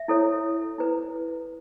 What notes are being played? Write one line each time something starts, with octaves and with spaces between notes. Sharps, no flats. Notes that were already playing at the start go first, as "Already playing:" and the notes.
Already playing: E5
E4 A4 C#5
E4 B4